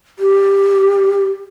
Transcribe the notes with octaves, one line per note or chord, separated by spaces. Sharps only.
G4